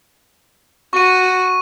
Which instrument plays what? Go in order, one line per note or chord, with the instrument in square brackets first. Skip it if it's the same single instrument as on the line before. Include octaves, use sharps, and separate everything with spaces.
[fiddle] F#4 [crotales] C#6 D#7